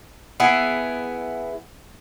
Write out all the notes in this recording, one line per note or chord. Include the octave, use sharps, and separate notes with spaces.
B3 E4 G#4